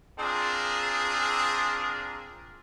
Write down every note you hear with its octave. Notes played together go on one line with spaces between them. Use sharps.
C4 D4 F4 G#4 A#4